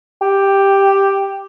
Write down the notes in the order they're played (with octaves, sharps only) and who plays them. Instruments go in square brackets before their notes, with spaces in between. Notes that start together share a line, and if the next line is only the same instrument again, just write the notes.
[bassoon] G4